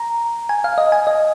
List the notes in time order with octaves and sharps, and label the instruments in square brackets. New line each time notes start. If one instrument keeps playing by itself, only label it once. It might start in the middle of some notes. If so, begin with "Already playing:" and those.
Already playing: [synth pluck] A#5
G#5
F5
D#5
G#5
D#5